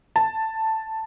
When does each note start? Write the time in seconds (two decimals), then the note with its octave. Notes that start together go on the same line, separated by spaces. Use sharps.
0.16 A5